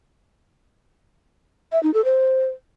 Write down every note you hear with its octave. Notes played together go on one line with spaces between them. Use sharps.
E5
D#4
A4
C5